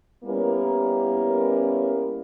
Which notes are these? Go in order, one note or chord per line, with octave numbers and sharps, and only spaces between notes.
G3 A#3 B3 C#4 E4 A#4